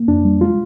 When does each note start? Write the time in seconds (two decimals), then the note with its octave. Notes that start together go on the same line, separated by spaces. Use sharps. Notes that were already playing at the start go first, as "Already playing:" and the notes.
Already playing: A#3
0.08 F2 D4
0.25 G3
0.41 G#3 F4